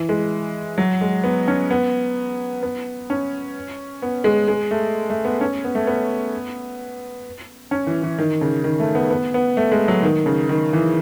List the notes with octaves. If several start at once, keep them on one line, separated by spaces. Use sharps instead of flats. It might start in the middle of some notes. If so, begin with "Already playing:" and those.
Already playing: E3
G#3
F#3
G#3
B3
C#4
B3
B3
C#4
B3
G#3
G#3
A3
A3
B3
C#4
B3
A3
B3
C#4
E3
E3
D#3
C#3
D#3
A3
B3
B3
B3
A3
G#3
F#3
D#3
C#3
D#3
E3